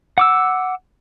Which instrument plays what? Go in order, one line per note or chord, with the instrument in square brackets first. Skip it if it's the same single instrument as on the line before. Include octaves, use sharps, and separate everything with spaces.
[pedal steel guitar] F#5 D6 E6